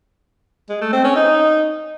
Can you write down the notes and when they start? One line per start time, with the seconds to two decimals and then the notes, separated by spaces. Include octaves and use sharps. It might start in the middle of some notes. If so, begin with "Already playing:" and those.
0.70 G#3
0.81 A3
0.93 C4
1.04 C#4
1.16 D#4